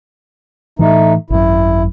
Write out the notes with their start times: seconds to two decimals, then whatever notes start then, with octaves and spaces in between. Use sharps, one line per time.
0.79 A2 E3 A3 D#4
1.30 G#1 F#2 E4